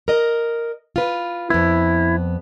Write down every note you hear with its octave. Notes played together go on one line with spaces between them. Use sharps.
A#4 D#5
F4 B4
F2 B3 E4